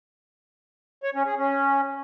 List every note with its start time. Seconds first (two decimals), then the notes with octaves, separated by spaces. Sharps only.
1.03 C#5
1.15 C#4
1.26 G#4
1.37 C#4